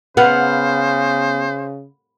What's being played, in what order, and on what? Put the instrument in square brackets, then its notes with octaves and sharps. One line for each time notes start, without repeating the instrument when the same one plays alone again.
[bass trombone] C#3 [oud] B3 [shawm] C5 [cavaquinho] F5 F#5